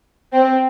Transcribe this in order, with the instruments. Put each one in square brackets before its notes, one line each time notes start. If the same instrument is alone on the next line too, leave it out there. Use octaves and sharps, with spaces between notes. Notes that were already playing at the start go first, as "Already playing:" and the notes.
[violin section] C4